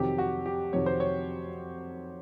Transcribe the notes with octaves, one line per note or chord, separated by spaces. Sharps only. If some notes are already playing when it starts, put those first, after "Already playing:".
Already playing: F2 C3 D#3 F#3 G4
F#4
G4
F2 C3 D#3 F#3 C#5
C5
C#5